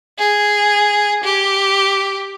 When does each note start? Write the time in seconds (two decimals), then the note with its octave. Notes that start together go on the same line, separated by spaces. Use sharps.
0.19 G#4
1.24 G4